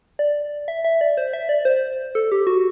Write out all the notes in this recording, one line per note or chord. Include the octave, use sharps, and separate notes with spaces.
D5
E5
E5
D5
C5
E5
D5
C5
A4
G4
F#4